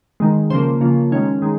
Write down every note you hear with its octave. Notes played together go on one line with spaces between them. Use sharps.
D#3 G#3
C#3 F3 A#3 C5
C#3 F3 A#3
D#3 G#3 C#4
D#3 G#3